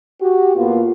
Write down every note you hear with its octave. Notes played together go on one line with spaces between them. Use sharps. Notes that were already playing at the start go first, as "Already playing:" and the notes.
F#4 G4
A2 A#3 B3 F4